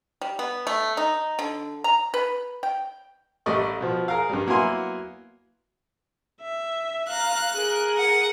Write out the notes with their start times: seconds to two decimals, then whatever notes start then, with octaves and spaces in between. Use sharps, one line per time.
0.21 G3
0.39 B3
0.67 A3
0.97 D#4
1.39 D3
1.84 A#5
2.14 B4
2.63 G5
3.46 A1 G3 A3 D5 D#5 C#6
3.81 B2 F3
4.08 G#4 A#4 F5
4.30 G2 G3
4.47 F#3 A#3 B3 E4 G#5 C6
6.41 E5
7.09 F5 A#5 F#6
7.55 G#4 A#4
7.98 F#5